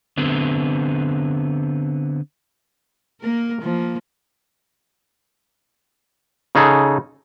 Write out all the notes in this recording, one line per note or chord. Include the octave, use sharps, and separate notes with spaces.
D3 B3 C4
A#3 A#4
F3 A#3
C#3 D#4 G#4 A4